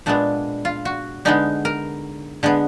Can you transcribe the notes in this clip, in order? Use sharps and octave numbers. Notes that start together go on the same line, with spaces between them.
A#2 G#3 B3 D4
F4
F#4
D3 G#3 B3 D#4
A#4
D3 G#3 B3